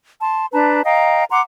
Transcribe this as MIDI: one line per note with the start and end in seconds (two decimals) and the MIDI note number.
0.21 0.46 81
0.21 0.46 84
0.53 0.82 62
0.53 0.82 71
0.53 0.82 81
0.53 0.82 82
0.85 1.24 75
0.85 1.24 77
0.85 1.24 79
0.85 1.24 82
1.31 1.41 78
1.31 1.41 82
1.31 1.41 84
1.31 1.41 86